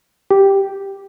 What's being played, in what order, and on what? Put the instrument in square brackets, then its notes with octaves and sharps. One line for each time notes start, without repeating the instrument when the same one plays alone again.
[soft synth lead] G4